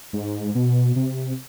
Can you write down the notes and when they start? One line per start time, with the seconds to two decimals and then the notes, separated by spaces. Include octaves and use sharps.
0.13 G#2
0.55 B2
0.96 C3